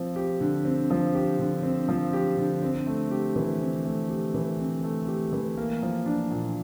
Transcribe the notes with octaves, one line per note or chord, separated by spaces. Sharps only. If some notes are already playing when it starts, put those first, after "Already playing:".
Already playing: F3 C4
G4
D3
C4
F3
G4
D3
C4
F3
G4
D3
C4
A3
G4
E3
C4
A3
G4
E3
C4
A3
G4
E3
A#3
F3
D4
A#2